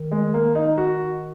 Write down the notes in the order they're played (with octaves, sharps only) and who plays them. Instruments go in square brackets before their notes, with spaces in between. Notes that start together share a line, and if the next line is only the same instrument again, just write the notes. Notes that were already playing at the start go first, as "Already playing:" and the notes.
Already playing: [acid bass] D#3
[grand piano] G#3
A#3
D#4
F#4